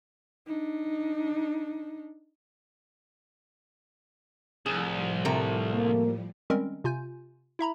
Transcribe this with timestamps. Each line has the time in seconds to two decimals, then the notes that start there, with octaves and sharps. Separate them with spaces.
0.47 D4 D#4
4.66 C2 A2 F3 G3 G#4
5.25 C3 A3 A#4
5.71 A#3
6.50 D#3 G3 G#3 C4 C#4 A#4
6.84 C3 F4 G#5 G6
7.59 E4 E5 A#5 B5